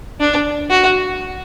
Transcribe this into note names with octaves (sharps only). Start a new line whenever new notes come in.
D4
F#4